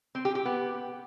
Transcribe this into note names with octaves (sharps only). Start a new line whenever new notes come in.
C4
G4
G4
B3